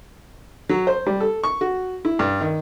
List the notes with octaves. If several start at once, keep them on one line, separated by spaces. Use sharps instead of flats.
F#3
C5
G3
A4
C#6
F#4
E4
G2
D#3